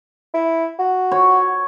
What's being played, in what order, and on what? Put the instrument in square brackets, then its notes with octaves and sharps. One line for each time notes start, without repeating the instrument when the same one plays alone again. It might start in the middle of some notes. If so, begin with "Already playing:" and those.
[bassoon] E4
F#4
[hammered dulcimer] C#5